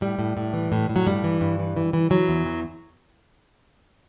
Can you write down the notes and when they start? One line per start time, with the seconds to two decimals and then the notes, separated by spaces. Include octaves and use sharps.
0.01 A2 G3
0.19 A2
0.37 A2
0.53 E3
0.72 A2
0.89 A2
0.96 F#3
1.07 G2 G3
1.24 E3
1.41 G2
1.59 E3
1.76 E3
1.93 E3
2.10 E3 F#3
2.28 E2
2.46 E3